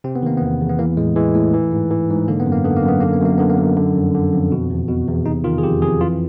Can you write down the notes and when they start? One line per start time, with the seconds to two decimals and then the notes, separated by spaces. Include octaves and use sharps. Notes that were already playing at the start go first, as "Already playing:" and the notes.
0.04 C3 C4
0.16 B3
0.22 D#3 A#3
0.37 E2 B3
0.61 E2
0.69 B3
0.79 E3 A#3
0.97 A2 G#3
1.16 E3 G#3
1.35 A2 A3
1.53 E3
1.72 G#2
1.91 E3
2.10 G#2
2.28 D3 A#3
2.40 B3
2.46 F#2
2.52 A#3
2.64 D3 B3
2.77 A#3
2.84 F#2 B3
3.00 D3 A#3
3.13 B3
3.21 F#2 A#3
3.38 D3 B3
3.49 A#3
3.58 F#2
3.77 D3
3.95 F2
4.14 D3
4.33 F2
4.52 B2
4.70 E2
4.88 B2
5.08 E2
5.26 C3 D#4
5.44 D#3 F4
5.58 G#4
5.63 F2 G4
5.82 F2 G#4
6.00 E3 F4